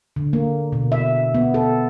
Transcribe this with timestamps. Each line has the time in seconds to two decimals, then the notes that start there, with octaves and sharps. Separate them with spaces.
0.16 D3
0.33 A#3
0.72 B2
0.92 E5
1.34 B3
1.54 A4